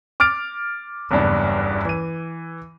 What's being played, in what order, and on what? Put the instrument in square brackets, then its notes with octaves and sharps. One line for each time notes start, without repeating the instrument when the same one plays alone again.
[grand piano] D6 F6 A6 D7
F#1 E2 G2 D4
E3 D#7